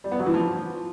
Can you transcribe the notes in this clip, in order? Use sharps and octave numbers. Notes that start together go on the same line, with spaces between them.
G3
B3
F#3
E3
F3